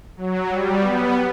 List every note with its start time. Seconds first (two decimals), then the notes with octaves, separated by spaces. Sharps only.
0.17 F#3
0.48 G3
0.80 B3